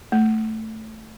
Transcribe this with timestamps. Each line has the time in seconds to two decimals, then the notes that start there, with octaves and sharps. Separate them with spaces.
0.12 A3